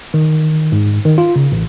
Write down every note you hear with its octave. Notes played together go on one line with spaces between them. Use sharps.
D#3
G#2
D#3
F4
C#3
A1